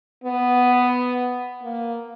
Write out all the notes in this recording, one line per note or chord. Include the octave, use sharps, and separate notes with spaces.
B3
A#3